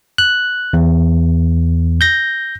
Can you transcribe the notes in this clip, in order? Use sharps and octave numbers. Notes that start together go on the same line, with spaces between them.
F#6
E2
G6 A#6